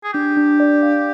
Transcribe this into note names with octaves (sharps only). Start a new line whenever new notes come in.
G#4
D4 G4
D4
D5
F5